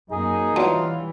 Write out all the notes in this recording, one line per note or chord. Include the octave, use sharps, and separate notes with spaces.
F#2 A#3 D#4 G#4
E3 F#3 G3 B3 D4 F4